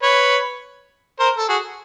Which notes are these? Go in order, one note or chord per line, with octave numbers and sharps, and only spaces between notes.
B4 C#5
A#4 C5
A4
F#4 G#4